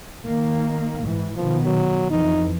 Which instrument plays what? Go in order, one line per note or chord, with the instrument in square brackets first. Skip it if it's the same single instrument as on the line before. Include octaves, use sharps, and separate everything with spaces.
[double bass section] D#3 A#3
G#2 E3
[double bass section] B2 D#3 B3 [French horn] F3
[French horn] F#3
[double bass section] F2 E3 [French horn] D#4